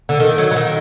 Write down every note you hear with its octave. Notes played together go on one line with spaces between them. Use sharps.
D3
D#3
F#3
F#3
D#3